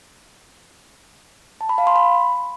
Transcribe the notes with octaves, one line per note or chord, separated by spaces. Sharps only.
A5
B5
F5
C6
B5